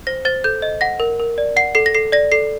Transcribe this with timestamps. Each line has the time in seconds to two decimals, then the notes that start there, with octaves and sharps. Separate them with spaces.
0.07 C5 A#6
0.25 C5 A6
0.44 A4 G6
0.62 D#5
0.81 F#5 A#6
1.00 A#4
1.20 A#4
1.38 D5
1.56 F#5 C7
1.75 A4 C7
1.86 A#6
1.95 A4 C7
2.12 D5 A#6
2.32 A4 C7